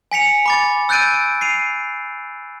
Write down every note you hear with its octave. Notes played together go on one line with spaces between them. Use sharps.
G#5 B6 C#7 F7
B5 D6 A6
E6 F#6 G6 A6 D7 D#7
C7 D#7 F7